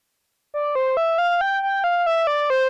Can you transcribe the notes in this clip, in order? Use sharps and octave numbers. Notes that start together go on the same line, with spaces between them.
D5
C5
E5
F5
G5
G5
F5
E5
D5
C5